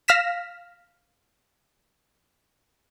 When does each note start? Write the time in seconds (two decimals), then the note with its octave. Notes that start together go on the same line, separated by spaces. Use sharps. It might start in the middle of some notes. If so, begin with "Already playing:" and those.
0.08 F5 F6 A#6 B6 E7